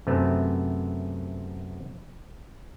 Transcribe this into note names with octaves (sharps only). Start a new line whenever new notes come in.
F#2 C3 A3 B3 C4